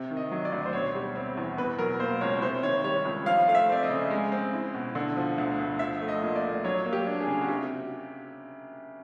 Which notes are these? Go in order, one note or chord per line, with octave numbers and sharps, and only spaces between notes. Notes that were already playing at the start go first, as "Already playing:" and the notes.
Already playing: C3
D#3
D#5
F#3
D5
D2
C5
B2 C#5
G3
C4
E2
B2 B4
F#3 A#4
A#3 C5
C#2 C#5
C3 C5
D#3 C#5
G3 C#5
C#2
F3 F5
A3 F5
E5
C4 D5
D#5
C#3
G#3
C4
E4
B2
D3
F3
D2
D2
F3 E5
A3
D#5
A#2
D5
A#2
F#3 C#5
A#3
G4
D4
G#4
C#3
F#4
C3 G4